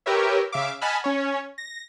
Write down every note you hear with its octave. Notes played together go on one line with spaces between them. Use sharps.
G4 A#4 B4 C#5 E5
C#3 E5 F5 D6
D#5 F#5 G#5 A5 B5 F6
C#4 C#5
A#6